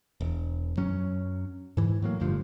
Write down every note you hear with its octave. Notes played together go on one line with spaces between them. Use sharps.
E1
F#2 F#3 C#4
G#2 E3
A2 F#3 A#3
G1 D2 G2 F3